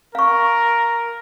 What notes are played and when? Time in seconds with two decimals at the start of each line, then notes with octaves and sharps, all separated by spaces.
0.15 A#4 F5 C#6